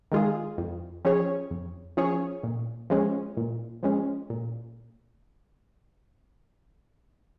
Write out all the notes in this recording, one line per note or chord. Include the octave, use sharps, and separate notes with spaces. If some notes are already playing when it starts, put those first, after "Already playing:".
D#3 G#3 F4 G#4
F2
F3 C#4 G#4 C#5
F2
F3 C#4 G#4 C#5
A#2
F3 G#3 C#4
A#2
F3 G#3 C#4
A#2